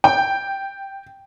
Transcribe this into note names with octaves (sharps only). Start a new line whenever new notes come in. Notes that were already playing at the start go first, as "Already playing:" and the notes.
G5